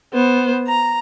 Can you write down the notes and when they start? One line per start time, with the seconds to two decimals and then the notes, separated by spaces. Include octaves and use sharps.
0.13 B3 C5
0.67 A#5